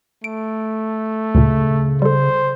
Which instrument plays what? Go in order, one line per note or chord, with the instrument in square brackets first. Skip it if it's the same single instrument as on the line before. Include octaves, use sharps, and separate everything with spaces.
[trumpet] A3 [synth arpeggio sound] D7
[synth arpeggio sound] D2 A#2 [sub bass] C#3
[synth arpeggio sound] G3 A4 [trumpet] C5